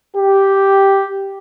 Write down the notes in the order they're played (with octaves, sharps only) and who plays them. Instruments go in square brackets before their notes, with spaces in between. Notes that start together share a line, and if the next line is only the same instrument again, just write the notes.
[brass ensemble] G4